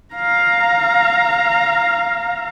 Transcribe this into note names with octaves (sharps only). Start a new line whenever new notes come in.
F5 A#5